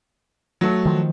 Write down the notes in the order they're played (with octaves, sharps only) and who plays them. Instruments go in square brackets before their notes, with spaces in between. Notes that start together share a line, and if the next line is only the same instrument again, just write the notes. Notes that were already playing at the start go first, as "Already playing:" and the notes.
[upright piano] F#3 A3
[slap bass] D#3 F3